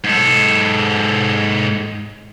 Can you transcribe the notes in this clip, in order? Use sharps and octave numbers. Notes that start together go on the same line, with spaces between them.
G#2 A4